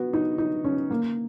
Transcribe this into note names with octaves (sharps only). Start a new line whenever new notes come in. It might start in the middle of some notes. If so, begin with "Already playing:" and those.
Already playing: B3 F#4
D#4
D#4
C#4
A#3